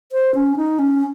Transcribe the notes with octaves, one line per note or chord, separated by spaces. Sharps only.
C5
C#4
D#4
C#4